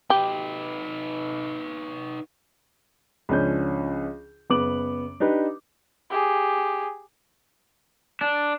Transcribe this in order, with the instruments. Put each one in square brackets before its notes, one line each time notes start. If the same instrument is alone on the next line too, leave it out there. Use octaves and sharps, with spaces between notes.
[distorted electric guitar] D#4 B4 [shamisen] G4
[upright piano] C#2 F3 C#4 D4 G6
F#1 B3 D6 F#7
D4 D#4 G4 B4
[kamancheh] G4 G#4
[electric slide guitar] D4